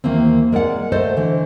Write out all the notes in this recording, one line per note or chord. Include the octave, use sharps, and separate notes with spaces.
D#2 E3 A#3 C4
G#3 A#4 D5 F#5
A3 A4 C5 D#5
D3 E3